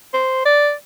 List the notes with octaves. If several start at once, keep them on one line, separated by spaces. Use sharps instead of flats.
C5
D5